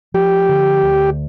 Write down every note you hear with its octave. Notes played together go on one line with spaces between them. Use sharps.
F3 G4
D3
D2